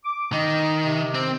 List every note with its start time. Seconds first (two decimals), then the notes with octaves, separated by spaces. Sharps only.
0.04 D6
0.32 D#3 D#5
0.85 C3
1.14 C4